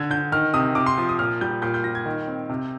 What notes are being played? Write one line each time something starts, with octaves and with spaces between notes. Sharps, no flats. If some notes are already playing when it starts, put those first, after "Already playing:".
Already playing: D3 G#6
D3 G6
D#3 F6
C3 D#6
C3 D6
C6
F3
D#6
A#2 F6
G3 G6
A#2 G6
G6
G3 A#6
G#6
D#3
C4
C3